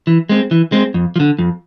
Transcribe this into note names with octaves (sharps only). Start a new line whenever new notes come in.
E3
G#3 C4
E3
G#3 C4
F2
F3
D3
F2